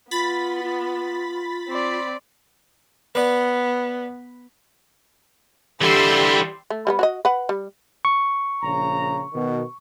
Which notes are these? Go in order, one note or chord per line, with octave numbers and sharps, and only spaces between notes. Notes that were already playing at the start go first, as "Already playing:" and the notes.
B3 F4 B5 A6 B6
F4
C4 D5
B3 B4 D5
D3 E3 G3 G4 C6 E6
A3
G3 G#3 B3
F#4 C#5 D#5
B4 F#5
G3
C#6
A#1 C#3 A#5
B2 D#3